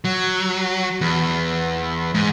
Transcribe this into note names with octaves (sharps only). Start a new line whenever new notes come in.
F#3
E2
G#2